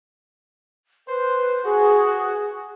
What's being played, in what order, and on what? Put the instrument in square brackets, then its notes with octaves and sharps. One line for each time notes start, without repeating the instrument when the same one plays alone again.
[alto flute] B4 [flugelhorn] C5
[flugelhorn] F#4 [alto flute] G#4